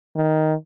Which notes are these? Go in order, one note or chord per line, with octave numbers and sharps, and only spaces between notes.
D#3